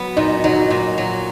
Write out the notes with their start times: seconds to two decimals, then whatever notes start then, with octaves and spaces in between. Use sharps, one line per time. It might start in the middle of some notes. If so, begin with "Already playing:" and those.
Already playing: F#3 B3
0.17 A#2 D#4
0.44 F#3 D#4
0.70 A#2
0.98 F#3